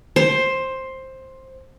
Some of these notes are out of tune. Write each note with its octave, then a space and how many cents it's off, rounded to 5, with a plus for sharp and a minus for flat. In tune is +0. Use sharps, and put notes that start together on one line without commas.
C5 +10